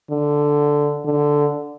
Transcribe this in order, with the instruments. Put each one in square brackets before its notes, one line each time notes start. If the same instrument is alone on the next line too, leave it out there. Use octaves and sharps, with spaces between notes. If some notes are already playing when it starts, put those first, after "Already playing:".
[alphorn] D3
D3